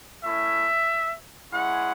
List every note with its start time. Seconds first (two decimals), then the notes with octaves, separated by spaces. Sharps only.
0.23 A3 C#4 E4 E5
1.52 G#3 C#4 E4 F#5